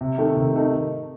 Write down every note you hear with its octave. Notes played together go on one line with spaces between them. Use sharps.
C3
D#3 A3 D#4
C3
D#3 A3 D#4